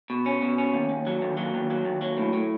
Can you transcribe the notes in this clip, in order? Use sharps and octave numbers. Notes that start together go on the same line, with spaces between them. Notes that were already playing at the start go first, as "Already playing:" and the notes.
B2
C#4
B2
C#4
D#2
D#2
F#3
D#2
F#3
D#2
F#3
D#2
F#3
A2
A2